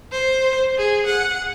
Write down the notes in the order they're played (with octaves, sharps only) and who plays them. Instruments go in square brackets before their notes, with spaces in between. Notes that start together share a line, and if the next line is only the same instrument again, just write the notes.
[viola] C5
G#4
F#5